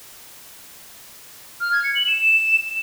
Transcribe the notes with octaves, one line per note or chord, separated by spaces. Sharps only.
F6
G#6
C#7
F#7
E7